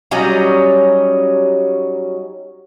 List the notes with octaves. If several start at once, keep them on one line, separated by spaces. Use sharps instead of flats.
F#3 G3 C#4 D#4